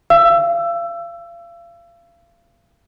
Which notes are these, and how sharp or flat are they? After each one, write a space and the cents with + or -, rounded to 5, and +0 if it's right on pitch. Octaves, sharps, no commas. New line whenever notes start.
F5 -35 E6 +15